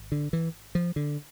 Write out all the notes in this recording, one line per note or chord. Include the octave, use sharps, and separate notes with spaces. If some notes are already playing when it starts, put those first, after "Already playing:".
Already playing: G#1
D3
E3
F3
D3